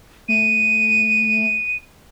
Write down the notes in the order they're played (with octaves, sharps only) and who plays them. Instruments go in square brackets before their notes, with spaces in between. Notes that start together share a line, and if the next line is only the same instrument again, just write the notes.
[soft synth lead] A3 [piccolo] D#7